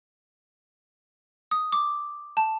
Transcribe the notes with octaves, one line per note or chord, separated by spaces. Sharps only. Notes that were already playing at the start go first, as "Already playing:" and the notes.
D#6
D6
A5